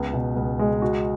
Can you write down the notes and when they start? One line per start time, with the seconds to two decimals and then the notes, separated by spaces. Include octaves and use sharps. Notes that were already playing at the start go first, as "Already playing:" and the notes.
Already playing: C#2 B3
0.13 B2
0.36 C#2
0.59 G#3
0.82 F#4